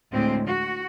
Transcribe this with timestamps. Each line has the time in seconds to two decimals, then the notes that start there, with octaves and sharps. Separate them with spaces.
0.11 D2 A2 G#3 C4
0.44 F#4